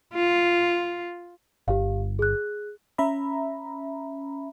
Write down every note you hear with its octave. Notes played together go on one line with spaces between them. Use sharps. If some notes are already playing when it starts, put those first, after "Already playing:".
F4
G1 G4 F5
G#4 F#6
C#4 E5 A#5 B5